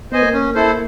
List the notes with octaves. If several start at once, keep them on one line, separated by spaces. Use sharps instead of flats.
B3 C5 D#5 G#5
A#3
C#4
E4 A4 C5